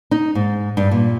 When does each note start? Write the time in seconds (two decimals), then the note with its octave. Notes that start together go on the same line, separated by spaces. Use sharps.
0.11 D#4
0.35 G#2
0.77 G2
0.91 A#2